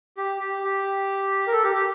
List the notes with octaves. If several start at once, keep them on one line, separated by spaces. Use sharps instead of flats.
G4
G4
G4
A#4
A4
G4
G4